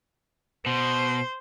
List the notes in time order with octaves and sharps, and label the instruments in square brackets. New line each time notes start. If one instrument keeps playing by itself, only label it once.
[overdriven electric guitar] B2 [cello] C5